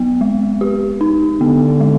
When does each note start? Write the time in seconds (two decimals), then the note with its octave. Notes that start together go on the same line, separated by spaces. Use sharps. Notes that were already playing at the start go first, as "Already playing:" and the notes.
Already playing: F#3 B3
0.21 G#3
0.61 G4
1.01 D#4
1.41 D3 B3
1.80 G#3